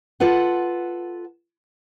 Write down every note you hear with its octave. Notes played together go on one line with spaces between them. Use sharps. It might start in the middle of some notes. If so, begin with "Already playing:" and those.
F4 A4 B4 F#5